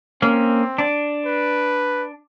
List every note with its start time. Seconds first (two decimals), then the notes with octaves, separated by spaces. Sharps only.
0.22 A#3 C4 C#4
0.78 D4
1.26 B4